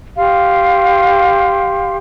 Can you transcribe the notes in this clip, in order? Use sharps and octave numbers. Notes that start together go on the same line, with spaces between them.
G4 F5 C6